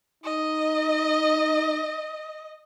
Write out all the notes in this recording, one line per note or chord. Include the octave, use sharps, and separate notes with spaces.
D#4 D#5